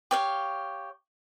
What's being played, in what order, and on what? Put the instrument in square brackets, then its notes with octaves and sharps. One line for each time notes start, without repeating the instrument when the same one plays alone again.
[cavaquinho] G4 C#5 F5